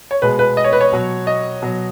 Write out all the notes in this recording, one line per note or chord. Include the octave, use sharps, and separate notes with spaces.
C#5
B2 G#3 B4
B4
D#5
C#5
B4
C#5
B2 F#3
D#5
B2 F#3